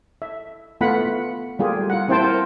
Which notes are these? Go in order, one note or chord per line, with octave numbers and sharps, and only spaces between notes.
E5
A3 B3 F4 F#5 B5
G3 A3 A#3 F4 G4 G#4
F4 F#5
A#3 C4 E4 C5 G5 A5
A#4